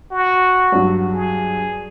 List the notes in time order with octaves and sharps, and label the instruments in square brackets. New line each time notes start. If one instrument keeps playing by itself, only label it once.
[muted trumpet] F#4
[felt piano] G2 F#3
[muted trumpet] G#4